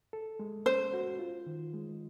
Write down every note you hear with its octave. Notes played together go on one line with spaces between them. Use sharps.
A4
G#3
C#4 C5
F#4
F4
D#3
G#3